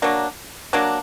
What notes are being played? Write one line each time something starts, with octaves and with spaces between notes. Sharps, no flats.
F#3 A#3 D4
F#3 A#3 D4